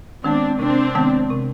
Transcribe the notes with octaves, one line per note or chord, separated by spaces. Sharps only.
D#3 G#3 B3 C4 D4
C3 C4 D4
D#3 G#3 B3
C3